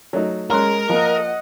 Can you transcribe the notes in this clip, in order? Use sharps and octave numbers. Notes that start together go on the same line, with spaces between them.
F#3 A3 D#4
G#3 C#4 A#4 C6 F#6
F3 A#3 D#5 F#5